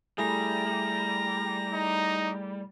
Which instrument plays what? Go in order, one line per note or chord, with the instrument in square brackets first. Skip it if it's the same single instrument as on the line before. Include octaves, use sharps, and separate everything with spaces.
[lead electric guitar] G3 [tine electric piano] A3 E4 G#4 [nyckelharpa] A#5
[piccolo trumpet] D#4